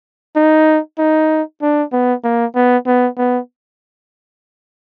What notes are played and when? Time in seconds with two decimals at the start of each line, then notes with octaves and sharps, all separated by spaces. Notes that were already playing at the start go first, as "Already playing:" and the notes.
0.36 D#4
0.99 D#4
1.62 D4
1.92 B3
2.24 A#3
2.55 B3
2.87 B3
3.18 B3